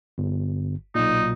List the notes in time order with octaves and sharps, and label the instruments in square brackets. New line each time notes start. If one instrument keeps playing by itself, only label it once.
[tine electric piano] G1
[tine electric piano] B1 A#2 [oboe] D#4